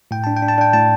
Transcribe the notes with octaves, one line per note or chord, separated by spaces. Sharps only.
A2 G5
D4 A5
G5
D4
A5
D4 G5
A2 A5